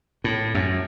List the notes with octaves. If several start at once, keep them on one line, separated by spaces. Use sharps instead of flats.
A2
F#2